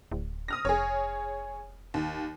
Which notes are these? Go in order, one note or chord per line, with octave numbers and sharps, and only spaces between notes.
D1
D#6 F6 A#6
F1 G#4 C#5
D#2